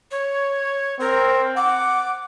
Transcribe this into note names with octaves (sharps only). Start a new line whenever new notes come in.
C#5
C4 A#4
F#5 D6